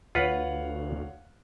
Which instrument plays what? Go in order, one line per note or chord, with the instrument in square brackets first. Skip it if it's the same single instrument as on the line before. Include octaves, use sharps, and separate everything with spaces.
[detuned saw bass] D2 [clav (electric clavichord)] F4 B4 [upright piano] C#5 F5 F#5